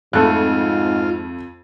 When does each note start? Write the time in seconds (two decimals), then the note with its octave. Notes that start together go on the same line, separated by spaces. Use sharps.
0.13 F2 G#2 A3 F4 F#6